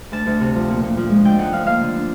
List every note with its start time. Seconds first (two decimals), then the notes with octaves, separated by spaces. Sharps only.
0.12 D2 A5
0.26 D2
0.41 C3
0.55 F3
0.69 A#2
0.83 A#2
0.97 F3
1.10 G#3
1.25 D3 G5
1.39 D#4 F#5
1.53 F3 F5
1.66 A#3 F5
1.81 D3
1.95 D4